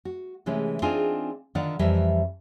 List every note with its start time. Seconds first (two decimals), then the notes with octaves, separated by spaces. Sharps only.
0.05 F#4
0.46 C3 E3 G#3 A3 C#4
0.82 C4 D4 D#4 F4 G#4 G#5
1.55 D3 D#3 F4 D5 F5 F#5
1.79 F2 E3 G3 A#4 E5